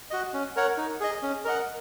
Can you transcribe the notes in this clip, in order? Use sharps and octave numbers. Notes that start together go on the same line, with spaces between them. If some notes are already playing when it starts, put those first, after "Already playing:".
F#4 D#5
C#4
A#4 C#5 F#5
D#4
G#4 D#5
C#4
A#4 D#5 F#5